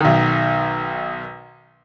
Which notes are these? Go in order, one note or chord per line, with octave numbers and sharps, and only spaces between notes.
B1 D#3